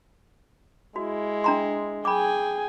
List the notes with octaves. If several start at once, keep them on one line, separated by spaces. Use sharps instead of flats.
G#3 E4 F#4
D4 A#5 C6
G#4 G5 G#5 B5 D6